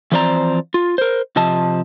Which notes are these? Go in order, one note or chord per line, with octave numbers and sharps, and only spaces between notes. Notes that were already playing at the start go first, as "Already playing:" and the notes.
E3 F3 C4 C5 D5 A#5
F4
A#4 C5
C3 F3 D#5 A5